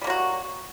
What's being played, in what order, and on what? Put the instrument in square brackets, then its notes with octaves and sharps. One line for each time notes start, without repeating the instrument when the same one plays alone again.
[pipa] G3
A#3
F#3
F#4